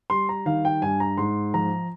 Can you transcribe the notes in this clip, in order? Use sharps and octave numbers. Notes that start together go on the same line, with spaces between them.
G3 C6
A#5
D#3 F5
G5
G2 G#5
A#5
G#2 C6
F3 A#5